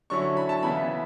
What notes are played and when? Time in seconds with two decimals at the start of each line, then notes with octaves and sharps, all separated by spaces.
0.10 D3 F#3 C#4 E4 C#6
0.37 B5
0.49 A5
0.63 C#3 E3 B3 E4 B5